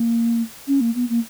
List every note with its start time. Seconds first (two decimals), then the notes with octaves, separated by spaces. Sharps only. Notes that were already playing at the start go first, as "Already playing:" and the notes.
Already playing: A#3
0.68 C#4
0.81 A#3
0.95 B3
1.10 A#3